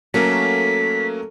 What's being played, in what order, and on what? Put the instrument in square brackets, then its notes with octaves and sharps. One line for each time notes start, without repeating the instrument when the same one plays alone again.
[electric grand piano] F#3 A#3 C#4 [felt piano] A3 A#4 [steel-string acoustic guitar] A4 [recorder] B6